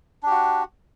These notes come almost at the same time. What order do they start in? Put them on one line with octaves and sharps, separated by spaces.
D4 G4 F#4